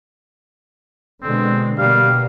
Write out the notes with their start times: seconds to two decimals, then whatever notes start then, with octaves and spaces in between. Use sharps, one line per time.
1.23 B2 D3 G#3 C4
1.78 B2 G3 A#3 F5